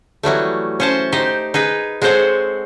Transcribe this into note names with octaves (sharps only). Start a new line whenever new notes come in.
E3 F#3 G3 A3
C#4 C5 A5
D#4 G4 C5
D#4 G#4 B4
G#3 C4 A4 C5 C#5 F#5